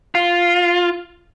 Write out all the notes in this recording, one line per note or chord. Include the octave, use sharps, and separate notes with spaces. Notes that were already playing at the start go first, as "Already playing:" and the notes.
F4